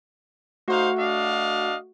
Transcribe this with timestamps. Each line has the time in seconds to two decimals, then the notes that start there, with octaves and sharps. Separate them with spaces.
0.68 A3 D#4 F#4 C5 F5 F#5
0.98 D4 D#5 F5